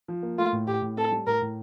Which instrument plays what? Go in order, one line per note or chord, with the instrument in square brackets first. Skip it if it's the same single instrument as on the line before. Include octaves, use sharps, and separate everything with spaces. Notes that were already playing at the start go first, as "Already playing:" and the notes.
[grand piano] F3
A#3
[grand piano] A3 [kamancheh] F4
[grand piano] A2
[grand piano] A2 [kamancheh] G4
[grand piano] A2
[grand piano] C4 [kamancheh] A4
[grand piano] G3
[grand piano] A2 [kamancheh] A#4
[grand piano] A2